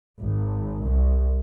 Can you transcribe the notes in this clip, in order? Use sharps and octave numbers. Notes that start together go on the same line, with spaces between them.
G#1
C2